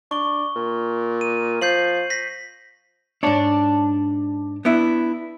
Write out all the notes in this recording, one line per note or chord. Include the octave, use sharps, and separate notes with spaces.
D4 C#6 G7
A#2
D#7
F3 G6 C7 F#7
A#6 B6
G#2 D4 C#5 D5 A5
B3 D4 E4